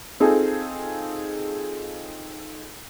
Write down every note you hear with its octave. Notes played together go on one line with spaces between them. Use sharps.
C4 D#4 F4 G#4 A4